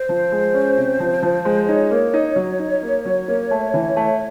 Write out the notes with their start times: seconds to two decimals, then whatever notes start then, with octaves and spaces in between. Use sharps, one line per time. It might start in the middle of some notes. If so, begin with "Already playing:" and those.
Already playing: C5
0.09 F3
0.32 G#3
0.54 C#4
0.77 C3
1.00 F3
1.23 F3
1.45 G#3
1.68 D#4 C#5
1.91 A#3
2.14 D#4
2.36 F#3
2.59 D#4
2.83 A#3
3.05 F#3
3.28 A#3
3.51 A3
3.74 E3
3.96 A3